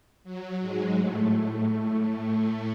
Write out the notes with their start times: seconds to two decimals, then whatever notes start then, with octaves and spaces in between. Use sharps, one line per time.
0.24 F#3
0.60 G#2 G#3
0.97 A2 A3